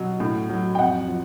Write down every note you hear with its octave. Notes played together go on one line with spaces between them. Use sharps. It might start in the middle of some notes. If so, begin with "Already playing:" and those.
Already playing: B2 F#3
A2
F#3
G5
F2 F#5
F3